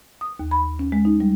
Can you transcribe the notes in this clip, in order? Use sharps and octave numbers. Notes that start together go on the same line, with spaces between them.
D#6
D#2
B5
C#4
G#3
D#4
G3